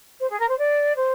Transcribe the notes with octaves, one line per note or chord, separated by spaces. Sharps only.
C5
G#4
A#4
C5
D5
C5